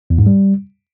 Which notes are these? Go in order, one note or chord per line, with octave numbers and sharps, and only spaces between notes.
E2
G#2
G3